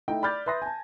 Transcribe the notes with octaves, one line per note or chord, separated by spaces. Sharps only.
A3 D#4 E4 G5
D5 B5 D6 F6 G6 A6
B4 E5 C6 D#6 A#6
G#5 A5